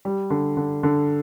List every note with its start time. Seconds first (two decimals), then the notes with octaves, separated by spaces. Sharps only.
0.05 G3
0.30 D3
0.57 D3
0.83 D3